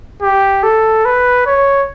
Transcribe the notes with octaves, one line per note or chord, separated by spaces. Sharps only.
G4
A4
B4
C#5